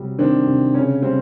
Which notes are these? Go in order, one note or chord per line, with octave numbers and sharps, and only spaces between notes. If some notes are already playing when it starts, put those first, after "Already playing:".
Already playing: C3 F#3 G3
D#3 C4 D4
C3
C#3 C#4
G3 C4